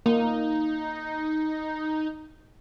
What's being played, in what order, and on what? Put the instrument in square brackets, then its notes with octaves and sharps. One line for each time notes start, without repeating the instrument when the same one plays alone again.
[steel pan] A#3 [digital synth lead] D#4